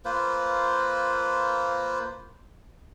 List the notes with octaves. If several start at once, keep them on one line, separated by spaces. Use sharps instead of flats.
A#3 F4 B4 C5